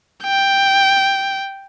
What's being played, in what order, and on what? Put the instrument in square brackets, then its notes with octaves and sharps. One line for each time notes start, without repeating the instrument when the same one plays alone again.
[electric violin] G5